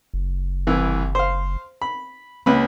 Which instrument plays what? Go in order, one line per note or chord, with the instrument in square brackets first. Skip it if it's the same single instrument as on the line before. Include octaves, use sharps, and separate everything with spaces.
[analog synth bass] F#1
[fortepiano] C2 E3
C5 F5
B5
[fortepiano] C#2 B4 B5 [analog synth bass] A#3